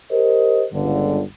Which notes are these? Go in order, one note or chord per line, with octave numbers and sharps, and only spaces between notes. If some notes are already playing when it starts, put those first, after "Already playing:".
G4 A#4 C5 D#5
G1 C#2 G2 D3